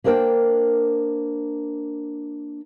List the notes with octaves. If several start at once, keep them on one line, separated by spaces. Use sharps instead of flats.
A#3 D4 A#4 C5 G5